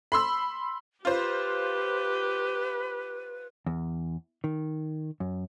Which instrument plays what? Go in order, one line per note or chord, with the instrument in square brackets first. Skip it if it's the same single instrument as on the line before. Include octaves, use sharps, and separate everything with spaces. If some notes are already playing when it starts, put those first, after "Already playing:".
[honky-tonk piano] B5 C6 E6
[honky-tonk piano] F4 C5 [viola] G4 [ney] B4
[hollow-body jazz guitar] E2
D#3
F#2